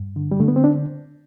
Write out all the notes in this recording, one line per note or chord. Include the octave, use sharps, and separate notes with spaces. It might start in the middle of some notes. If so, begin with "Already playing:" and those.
Already playing: G2
D3
G3
D3 A3
B3
C4
D4